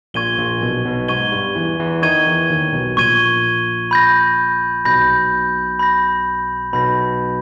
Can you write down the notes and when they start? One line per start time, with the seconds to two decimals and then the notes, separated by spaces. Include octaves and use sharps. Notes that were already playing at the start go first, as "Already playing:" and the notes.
0.14 A#1 A#2 C#6 G#6 D#7 G7
0.38 A#1 A#2
0.62 B1 B2
0.85 B1 B2
1.08 G#2 G#3 C#6 G#6 D#7 G7
1.32 G2 G3
1.55 E2 E3
1.79 E2 E3
2.02 D#3 D#4 C#6 G#6 D#7 G7
2.26 E2 E3
2.50 D#2 D#3
2.73 B1 B2
2.97 A#1 A#2 C#6 G#6 D#7 G7
3.91 B5 G6 A#6
4.85 B1 B2 B5 G6 A#6
5.79 B5 G6 A#6
6.73 B1 B2 B5 G6 A#6